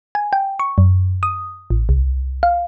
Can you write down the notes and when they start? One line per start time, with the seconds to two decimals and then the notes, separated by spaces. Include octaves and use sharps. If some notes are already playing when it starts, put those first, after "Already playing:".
0.15 G#5
0.33 G5
0.60 C#6
0.78 F#2
1.23 D#6
1.70 A1
1.89 C2
2.43 F5